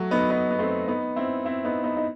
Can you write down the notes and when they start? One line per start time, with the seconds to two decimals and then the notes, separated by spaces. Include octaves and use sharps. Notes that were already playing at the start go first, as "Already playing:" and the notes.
Already playing: F#3 A3
0.11 B3 D#4
0.30 B3 D#4
0.50 B3
0.59 A3 C4
0.88 B3 D#4
1.16 C4 E4
1.45 C4 E4
1.65 B3 D#4
1.84 B3 D#4
1.97 D#4